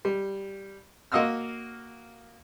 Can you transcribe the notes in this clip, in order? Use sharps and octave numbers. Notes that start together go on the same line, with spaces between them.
G3
A#3 F#4 D#5 F5 E6 F6